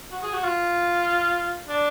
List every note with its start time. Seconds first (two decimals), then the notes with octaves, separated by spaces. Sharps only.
0.12 F#4
0.23 G#4
0.33 F#4
0.43 F4
1.69 D4